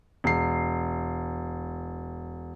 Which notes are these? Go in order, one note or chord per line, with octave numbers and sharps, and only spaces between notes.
E1 C7